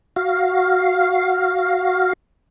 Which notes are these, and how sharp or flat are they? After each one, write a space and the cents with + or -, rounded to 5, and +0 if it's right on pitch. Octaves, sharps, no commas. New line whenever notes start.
F#4 +0 F5 +0